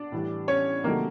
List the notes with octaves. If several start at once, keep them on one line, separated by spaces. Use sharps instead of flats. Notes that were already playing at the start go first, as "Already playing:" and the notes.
Already playing: D4 D5
A2 E3 G3
C#4 C#5
C3 D#3 F#3 A3 A#3 A#4